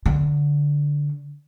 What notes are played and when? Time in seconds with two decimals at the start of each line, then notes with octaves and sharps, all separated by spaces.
0.06 D3